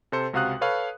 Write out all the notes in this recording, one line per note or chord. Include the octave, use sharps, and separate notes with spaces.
C3 A4 C5 C#7
C#2 C3 F#4 F5 D#6 F#6
A4 B4 C#5 F5 B5